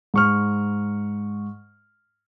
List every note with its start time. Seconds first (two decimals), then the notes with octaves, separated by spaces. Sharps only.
0.14 G#2 C#6 F6